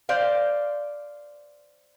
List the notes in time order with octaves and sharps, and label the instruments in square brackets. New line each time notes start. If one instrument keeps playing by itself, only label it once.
[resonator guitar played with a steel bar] C5 D5 F5